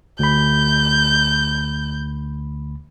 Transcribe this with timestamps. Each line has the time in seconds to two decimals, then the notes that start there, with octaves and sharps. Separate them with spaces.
0.19 D2 B5 G6